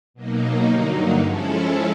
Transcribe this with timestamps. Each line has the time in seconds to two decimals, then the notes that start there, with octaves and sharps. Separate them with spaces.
0.14 B2 F#3 A#3 D#4
0.67 G2 D3 F#3 A#3 D#4
1.19 F3 G#3 C#4 E4 A4